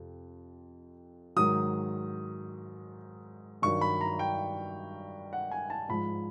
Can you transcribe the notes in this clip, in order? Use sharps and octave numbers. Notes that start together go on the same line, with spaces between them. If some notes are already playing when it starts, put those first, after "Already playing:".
Already playing: F2 C3
G#2 D#3 F#3 D#6
G2 D#3 F#3 C#6
B5
A#5
G5
F#5
G#5
A5
G#2 F3 B5